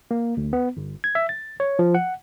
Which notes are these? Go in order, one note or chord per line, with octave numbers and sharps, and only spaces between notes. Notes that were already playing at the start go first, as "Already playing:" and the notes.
A#3
D2
B3
G1
G#6
E5
A6
C#5
F3
F#5